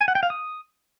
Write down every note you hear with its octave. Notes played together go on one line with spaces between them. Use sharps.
G#5
F#5
G5
F5
D#6